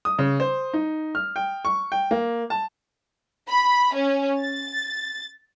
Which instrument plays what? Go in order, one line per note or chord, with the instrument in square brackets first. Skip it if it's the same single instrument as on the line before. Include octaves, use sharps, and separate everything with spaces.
[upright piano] D#6
C#3
C5
D#4
F6
G5
C#6
G5
A#3
A5
[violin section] B5
C#4
A6